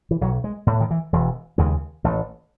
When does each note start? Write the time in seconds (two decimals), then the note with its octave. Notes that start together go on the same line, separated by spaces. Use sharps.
0.11 E3
0.21 B1 F#3
0.44 G#3
0.67 A2
0.80 D#3
0.91 E3
1.13 E1 E3
1.58 D#2 C#3 G#3
2.04 A1 A3